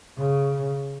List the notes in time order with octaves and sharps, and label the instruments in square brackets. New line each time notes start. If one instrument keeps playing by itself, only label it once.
[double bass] C#3